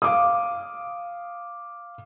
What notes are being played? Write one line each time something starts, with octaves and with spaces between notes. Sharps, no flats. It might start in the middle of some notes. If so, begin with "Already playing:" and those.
F5 D6 D#6